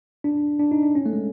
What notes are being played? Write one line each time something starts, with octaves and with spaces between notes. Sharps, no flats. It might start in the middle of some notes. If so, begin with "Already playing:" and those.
D4
D4
D#4
D4
C#4
A3
G#3